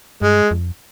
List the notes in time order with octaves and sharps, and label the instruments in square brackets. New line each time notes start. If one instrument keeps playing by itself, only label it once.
[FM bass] G2 [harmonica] G#3
[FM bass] F2